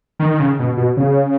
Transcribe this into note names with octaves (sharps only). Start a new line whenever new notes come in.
D#3
D#3
C#3
B2
B2
C#3